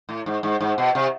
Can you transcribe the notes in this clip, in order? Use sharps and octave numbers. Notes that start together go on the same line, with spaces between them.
A2
G#2
G#2
G#2
B2
C3